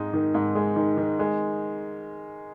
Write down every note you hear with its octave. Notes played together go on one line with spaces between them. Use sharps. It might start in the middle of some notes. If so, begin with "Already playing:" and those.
Already playing: G#2 G#3 D#4
D#3
G#2
G#3
D#3
D#3
G#3